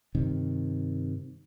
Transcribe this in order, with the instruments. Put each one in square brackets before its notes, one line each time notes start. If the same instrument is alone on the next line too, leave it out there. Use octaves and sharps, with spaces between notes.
[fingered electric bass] G2 C3 D#3